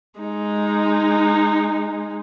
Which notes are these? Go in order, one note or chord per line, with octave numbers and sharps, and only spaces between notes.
G#3 D#4